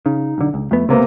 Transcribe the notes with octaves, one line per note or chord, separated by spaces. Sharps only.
C#3 D#4
B1 D3
C#2
F2 A3 B3
C#2 C3 A#3 B3